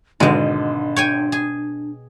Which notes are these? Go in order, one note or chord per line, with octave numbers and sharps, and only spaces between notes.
G#1 B2 D3 G#3 D4
C#5 G5 G#5
G#4